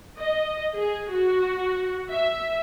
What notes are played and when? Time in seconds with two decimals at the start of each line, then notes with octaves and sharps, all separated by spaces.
0.18 D#5
0.75 G#4
1.11 F#4
2.11 E5